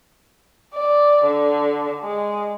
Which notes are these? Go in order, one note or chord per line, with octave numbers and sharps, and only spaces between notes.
D5
D3
G#3